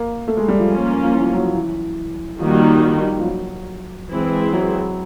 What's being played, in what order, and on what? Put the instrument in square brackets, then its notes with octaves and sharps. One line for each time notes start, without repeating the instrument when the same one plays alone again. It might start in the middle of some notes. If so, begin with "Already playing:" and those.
Already playing: [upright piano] A#3
A3
G#3
G3
F3
[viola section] A#3 C#4 F4
[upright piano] F3
E3
F3
F#3
F3
E3
[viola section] D#3 G3 A#3 D#4 F#4 [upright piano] F3
[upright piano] F3
F#3
[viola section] E3 G#3 C4 E4 G#4
[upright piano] F#3